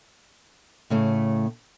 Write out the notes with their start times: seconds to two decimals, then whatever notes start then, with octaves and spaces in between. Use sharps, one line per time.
0.90 A2 C#3 A3